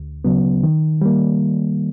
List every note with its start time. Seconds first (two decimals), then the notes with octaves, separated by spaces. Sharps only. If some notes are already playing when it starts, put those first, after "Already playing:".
Already playing: D2
0.24 C#3 F#3 B3
0.63 D#3
1.01 G3 A#3